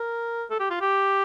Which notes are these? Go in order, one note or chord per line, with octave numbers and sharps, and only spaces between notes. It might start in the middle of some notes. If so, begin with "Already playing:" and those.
Already playing: A#4
A4
G4
F4
G4